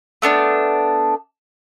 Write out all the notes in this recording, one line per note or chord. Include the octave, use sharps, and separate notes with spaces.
A3 B3 D4